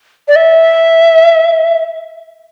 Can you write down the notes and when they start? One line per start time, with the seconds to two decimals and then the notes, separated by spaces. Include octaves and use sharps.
0.28 D5
0.35 E5